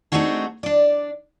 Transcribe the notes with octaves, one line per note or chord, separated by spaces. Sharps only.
A3 C4 D4 D#4 F#4 G#4
D4 D5